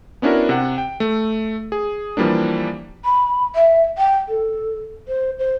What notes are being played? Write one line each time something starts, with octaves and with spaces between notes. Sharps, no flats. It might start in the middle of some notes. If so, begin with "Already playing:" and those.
B3 C#4 D4 E4 F#4 A#4
C3 F#5
G5
A3
G#4
E3 F3 G3 A#3 D4
B5
E5
G5
A4
C5
C5